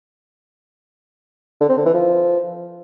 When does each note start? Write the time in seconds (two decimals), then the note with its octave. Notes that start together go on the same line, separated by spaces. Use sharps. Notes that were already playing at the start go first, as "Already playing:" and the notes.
1.61 D3
1.69 C4
1.77 D3
1.86 E3
1.94 F3